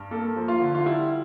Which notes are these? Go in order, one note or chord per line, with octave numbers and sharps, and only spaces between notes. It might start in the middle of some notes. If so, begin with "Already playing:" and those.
Already playing: G2
A#3 A4
F3
F4
D3
F4
G3 E4